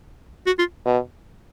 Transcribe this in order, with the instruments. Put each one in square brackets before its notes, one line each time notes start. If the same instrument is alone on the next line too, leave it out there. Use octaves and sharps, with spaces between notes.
[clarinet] F#4
F4
[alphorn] B2